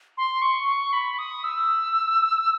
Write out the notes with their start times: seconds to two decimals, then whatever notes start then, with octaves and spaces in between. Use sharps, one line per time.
0.17 C6
0.42 C#6
0.68 C#6
0.93 B5
1.18 D#6
1.44 E6